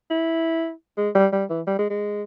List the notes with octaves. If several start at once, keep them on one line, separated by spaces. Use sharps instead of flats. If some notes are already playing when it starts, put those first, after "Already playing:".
E4
G#3
G3
G3
E3
G3
G#3
G#3